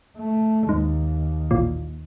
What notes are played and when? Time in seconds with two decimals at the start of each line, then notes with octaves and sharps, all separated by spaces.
0.17 A3
0.69 D#2 G#2
1.51 A1 A#2